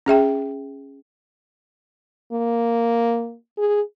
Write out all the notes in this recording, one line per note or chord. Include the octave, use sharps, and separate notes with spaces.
C#4 G#4 E5 G5
A#3
G#4